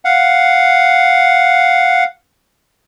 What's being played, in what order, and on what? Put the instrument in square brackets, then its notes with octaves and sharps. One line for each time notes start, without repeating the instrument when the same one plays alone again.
[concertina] F5 F#5